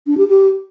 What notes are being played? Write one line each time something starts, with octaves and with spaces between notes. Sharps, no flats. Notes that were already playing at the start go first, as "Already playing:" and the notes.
D4
G4
G4